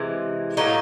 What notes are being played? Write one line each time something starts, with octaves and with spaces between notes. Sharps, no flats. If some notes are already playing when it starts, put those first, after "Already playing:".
Already playing: C3 E3 G#3
A2 F#3 A#3 D#4